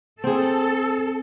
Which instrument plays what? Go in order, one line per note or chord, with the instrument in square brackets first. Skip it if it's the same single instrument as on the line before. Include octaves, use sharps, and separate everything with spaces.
[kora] C4 G#4 [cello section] A4